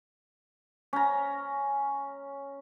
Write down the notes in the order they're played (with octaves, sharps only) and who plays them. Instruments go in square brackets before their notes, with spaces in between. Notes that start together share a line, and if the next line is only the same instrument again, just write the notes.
[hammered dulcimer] C#4 A#5